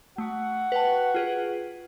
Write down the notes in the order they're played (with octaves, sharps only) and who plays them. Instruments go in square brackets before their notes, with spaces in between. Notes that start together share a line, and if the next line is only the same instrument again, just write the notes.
[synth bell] A3 [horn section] F#4 F#5
[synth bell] B4 G5 A5
F4 G#4 B4